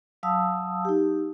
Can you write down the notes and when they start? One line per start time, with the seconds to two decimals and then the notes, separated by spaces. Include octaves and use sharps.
0.23 F#3 F5 A5 D#6 E6
0.85 D#4 G4